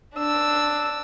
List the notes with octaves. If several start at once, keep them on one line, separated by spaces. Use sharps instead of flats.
D4 E6